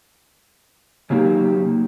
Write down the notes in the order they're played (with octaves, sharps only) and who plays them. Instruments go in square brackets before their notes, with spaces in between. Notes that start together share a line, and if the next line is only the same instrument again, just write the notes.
[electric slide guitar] C#3 F#3 A#3 D#4 G4